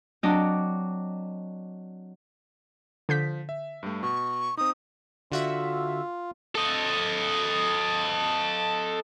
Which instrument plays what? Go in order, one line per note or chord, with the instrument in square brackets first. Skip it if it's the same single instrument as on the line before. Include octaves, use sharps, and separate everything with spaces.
[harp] F#3 C4 D4 D#5 D6
[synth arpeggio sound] D3 G6 B6 [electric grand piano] F3
[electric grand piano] E5
G2 G3 A3
[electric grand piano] B2 [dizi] C#6
[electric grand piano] C4 D#4 [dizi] D#6
[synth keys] D3 F#4 E5 [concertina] F4
[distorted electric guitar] A4 D#5